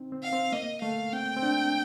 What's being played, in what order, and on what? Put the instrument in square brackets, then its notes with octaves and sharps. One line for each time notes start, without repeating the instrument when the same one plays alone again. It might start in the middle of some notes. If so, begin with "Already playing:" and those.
Already playing: [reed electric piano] C4 D#4
C4
[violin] F5
[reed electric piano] C4
[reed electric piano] A#3 [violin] D#5
[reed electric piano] A3 [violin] F5
[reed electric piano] C4 [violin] G5
[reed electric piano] C4
D4